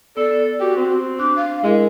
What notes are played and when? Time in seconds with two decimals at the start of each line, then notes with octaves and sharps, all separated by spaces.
0.17 B3 A4 D5
0.60 F#4 G4
0.76 C4
1.19 D4 D6 F#6
1.36 F5
1.64 G#3 E4 G#4 A#4